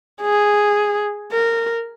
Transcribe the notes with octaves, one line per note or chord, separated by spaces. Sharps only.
G#4
A#4